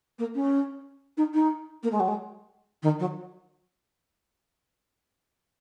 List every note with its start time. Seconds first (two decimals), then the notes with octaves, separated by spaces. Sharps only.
0.19 A#3
0.35 C#4
1.17 D#4
1.34 D#4
1.83 A#3
1.92 G#3
2.00 F#3
2.08 G#3
2.82 D#3
2.99 F#3